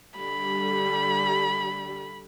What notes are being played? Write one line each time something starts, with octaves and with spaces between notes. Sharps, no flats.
D3 G3 B5